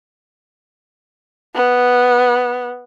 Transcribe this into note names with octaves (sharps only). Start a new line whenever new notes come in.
B3